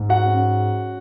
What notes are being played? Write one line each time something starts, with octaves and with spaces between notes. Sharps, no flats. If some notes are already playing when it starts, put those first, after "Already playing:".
Already playing: G#2 G#3
F#4 F#5
C#4